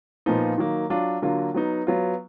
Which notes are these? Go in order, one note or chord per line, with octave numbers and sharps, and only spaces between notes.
A#2 F3 B3 D#4
D#3 F#3 A#3
F#3 D4 F4
D3 F#3 A#3 F4
F#3 B3 D#4
F#3 B3 F4